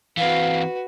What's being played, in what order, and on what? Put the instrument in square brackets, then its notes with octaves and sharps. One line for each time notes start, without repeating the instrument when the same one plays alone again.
[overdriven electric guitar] E3 C4 [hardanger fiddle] F#4 B4 [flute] F5